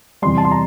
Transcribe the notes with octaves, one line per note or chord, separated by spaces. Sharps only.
E2 C3 G3 C6
A5
C6
A#5